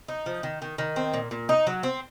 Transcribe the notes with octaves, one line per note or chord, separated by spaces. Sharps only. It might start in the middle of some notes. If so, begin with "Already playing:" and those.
D#4
F3
D#3
D#3
D#3
C4
A#2
A#2
D#4
F#3
C4